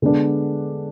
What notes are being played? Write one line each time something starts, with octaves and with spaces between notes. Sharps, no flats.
D3 G#3 B3 D4 A4